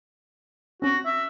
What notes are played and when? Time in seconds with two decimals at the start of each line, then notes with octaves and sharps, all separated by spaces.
0.82 C4 C#4 F#4
1.05 E5